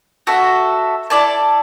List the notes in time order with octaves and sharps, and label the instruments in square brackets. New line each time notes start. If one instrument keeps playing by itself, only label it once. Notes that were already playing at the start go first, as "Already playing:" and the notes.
[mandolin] F#4 A4 E5
E4 A4 D5 A5